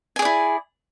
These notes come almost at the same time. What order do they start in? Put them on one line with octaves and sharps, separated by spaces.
G#5 G#4 D5 E4